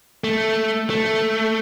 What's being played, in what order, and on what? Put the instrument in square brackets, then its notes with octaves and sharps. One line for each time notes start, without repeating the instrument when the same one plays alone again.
[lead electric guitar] A3
A3